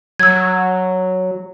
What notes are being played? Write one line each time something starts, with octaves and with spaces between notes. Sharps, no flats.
F#3 E6 G#6